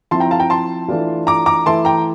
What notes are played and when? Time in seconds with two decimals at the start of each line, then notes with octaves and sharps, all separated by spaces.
0.11 F3 C4 E4 A5 C6
0.20 G5 A#5
0.31 F5 A5
0.40 G5 A#5
0.50 A5 C6
0.88 E3 A3 D4 F4
1.27 A#5 D6
1.46 A#5 D6
1.66 E3 A3 E4 A5 C6
1.85 G5 A#5